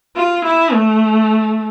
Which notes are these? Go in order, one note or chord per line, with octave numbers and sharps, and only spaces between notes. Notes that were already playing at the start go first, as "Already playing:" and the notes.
F4
E4
A3